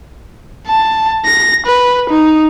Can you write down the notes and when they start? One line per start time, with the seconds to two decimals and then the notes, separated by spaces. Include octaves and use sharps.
0.67 A5
1.25 A#6
1.67 B4
2.10 D#4